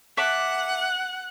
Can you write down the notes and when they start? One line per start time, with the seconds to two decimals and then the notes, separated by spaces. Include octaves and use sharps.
0.17 E5 F#5 A5 D6 F#6